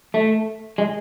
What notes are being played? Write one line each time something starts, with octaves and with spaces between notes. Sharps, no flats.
A3
G#3